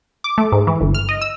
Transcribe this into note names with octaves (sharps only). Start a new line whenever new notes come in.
D6
A3
G#2
E3
G1
F6
D#5
E6